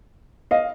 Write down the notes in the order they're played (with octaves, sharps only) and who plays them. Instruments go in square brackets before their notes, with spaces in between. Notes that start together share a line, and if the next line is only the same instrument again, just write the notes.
[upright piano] D#5 F5